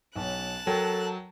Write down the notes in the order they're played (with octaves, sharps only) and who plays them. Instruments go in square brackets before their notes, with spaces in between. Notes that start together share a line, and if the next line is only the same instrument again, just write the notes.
[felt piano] B1 F#3 [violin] A5 F#6
[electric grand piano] F#3 [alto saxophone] A4 [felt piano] A#4 G5